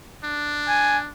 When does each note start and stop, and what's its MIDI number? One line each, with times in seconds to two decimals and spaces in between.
0.24 1.11 62
0.69 0.98 80